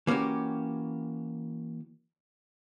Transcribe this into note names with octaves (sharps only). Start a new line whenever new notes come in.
E3 A#3 C#4 F#4 G4